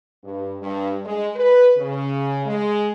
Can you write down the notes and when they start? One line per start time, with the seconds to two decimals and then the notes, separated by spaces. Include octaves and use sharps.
0.24 G2
0.62 G2
1.04 G#3
1.35 B4
1.76 C#3
2.46 G#3